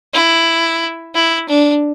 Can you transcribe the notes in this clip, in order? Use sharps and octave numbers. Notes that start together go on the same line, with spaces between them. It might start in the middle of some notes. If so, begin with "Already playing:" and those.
E4
E4
D4